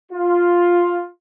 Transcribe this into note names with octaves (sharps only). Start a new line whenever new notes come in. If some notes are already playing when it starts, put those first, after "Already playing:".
F4